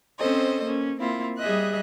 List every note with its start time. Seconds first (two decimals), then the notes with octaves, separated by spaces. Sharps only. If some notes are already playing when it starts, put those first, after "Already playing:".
0.19 C4 C#4 A4 C5 D#5
0.64 A#3 C#4
1.00 A#3 C4 E4 F4
1.38 G3 G#4 D#5 E5 F#6